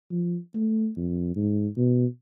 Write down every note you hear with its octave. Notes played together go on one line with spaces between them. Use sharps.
F3
A3
F2
G#2
B2